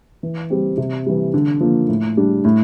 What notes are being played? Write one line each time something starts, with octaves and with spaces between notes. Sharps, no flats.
E3
G3 C4 G4
C3
E3 G3
D3
F3 A#3
A2
G3 D4
A2